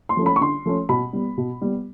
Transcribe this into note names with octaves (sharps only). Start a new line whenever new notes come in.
C6
F3 A3 C#4
B5
C#6
D3 C6
F3 A3 C#4
B2 B5
G3 B3
B2
G3 B3